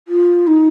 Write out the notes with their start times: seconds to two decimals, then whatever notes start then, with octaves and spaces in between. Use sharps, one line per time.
0.08 F4
0.47 D#4